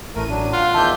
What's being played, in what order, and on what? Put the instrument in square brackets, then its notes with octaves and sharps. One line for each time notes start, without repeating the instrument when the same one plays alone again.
[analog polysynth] A1 A2 D#7 [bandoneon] A3 A#4
[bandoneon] F#3 D4
[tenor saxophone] F4 [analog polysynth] F5 [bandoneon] F#5
[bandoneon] E2 D#3 E5 [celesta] A5 D6 [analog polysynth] G6